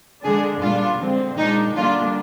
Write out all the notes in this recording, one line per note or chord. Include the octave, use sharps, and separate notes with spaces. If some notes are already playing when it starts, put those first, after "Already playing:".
D3 G#3 D4 G#4
A#2 G3 D4 F4
D3 G#3 C4
A#2 G#3 D4 D#4
D3 G3 A#3 D4 F4